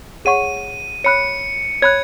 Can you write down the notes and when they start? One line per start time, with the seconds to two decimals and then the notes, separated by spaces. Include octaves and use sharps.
0.25 G#4 C#5 F#5 C#6 D#7
1.04 C#5 B5 F#6 C#7
1.82 C#5 B5 F#6 G#6